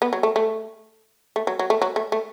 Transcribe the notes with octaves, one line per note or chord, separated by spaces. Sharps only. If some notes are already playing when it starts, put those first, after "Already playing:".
B3
F#3
A3
A3
A3
F#3
F#3
A3
F#3
A3
A3